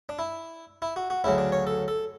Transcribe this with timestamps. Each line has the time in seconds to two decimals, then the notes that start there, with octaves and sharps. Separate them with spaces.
0.09 D4
0.19 E4
0.82 E4
0.96 F#4
1.10 F#4
1.24 D2 C#3 F#3 E4
1.38 D4
1.52 C#5
1.67 A4
1.88 A4